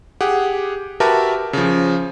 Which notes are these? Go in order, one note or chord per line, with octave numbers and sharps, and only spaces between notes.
G4 G#4 F#5
F#4 G4 A#4 B4 E5 A5
C#3 F3